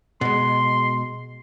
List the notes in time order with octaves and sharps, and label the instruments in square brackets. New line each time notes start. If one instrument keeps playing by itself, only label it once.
[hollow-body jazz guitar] B2 G#3 [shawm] C6